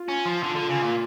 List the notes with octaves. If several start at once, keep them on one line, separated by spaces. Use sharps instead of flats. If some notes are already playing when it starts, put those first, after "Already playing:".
Already playing: F4
C#4
F3
D3 F4
D3
C#3
A#2